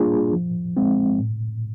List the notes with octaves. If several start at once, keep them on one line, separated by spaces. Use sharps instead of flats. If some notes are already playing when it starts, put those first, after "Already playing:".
Already playing: G3 A#3 D4 F4 G#4
F3
G#3 C4
A2